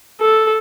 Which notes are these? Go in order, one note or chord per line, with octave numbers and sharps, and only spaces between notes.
A4